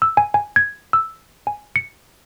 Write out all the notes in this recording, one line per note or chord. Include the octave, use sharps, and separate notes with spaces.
E6
G#5
G#5
G#6
E6
G#5
C#7